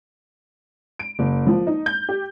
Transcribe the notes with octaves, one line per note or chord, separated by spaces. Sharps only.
D7
F#1
F3
D#4
G6
G4